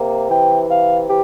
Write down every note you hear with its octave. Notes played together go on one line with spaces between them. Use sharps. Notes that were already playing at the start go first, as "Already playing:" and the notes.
Already playing: C3 A#3
E3 G5
C3 F5
E3 G4